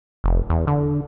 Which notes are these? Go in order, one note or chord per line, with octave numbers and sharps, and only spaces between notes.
F1
E2
D3